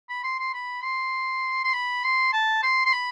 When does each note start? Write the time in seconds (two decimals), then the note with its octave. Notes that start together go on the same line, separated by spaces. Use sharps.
0.09 B5
0.24 C6
0.38 C6
0.53 B5
0.83 C6
1.64 C6
1.73 B5
2.04 C6
2.33 A5
2.63 C6
2.86 C6
2.92 B5